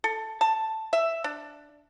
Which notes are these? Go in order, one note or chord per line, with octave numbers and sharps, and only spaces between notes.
A4
A5
E5
D4